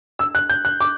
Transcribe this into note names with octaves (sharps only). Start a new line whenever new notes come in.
E6
F#6
G6
F#6
D6